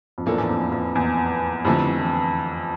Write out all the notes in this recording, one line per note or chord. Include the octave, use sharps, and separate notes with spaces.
F2
E2 A2 F3 A#3 D4 A4
E2
F2
F2
E2
F2 D3 A3 C4 E4 G4
E3